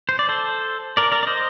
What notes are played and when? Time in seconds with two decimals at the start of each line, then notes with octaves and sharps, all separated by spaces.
0.09 C5
0.19 D5
0.29 A4 C5
0.97 A#4 D5
1.12 A#4 D5
1.23 D5
1.27 C5 D#5